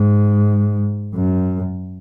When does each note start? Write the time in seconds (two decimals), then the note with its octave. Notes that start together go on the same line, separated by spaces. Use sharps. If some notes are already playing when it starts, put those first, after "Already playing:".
Already playing: G#2
1.15 F#2